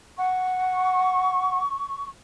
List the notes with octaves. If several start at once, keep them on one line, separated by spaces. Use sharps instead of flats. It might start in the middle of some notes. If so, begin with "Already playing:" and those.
F#5 C#6